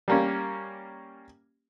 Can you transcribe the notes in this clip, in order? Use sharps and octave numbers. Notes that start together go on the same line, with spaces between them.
G3 A#3 C#4